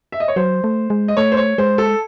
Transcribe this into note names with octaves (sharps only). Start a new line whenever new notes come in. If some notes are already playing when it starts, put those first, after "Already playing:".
E5
D#5
C#5
F#3 C5
A3
G#3
D#5
A3 C#5
C5
C#5
G#3 C5
A4